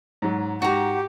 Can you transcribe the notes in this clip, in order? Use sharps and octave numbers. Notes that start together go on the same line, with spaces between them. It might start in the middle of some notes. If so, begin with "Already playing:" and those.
G#2 F#3
G#2 F#4 G4 A#5